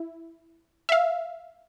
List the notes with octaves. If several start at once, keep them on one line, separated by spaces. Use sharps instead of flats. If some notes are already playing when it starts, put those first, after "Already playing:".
Already playing: E4
E5
F5